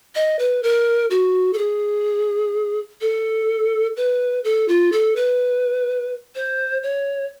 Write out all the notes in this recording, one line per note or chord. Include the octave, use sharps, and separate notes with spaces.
D#5
B4
A#4
F#4
A4
G#4
A4
B4
A4
F4
A4
B4
C5
C#5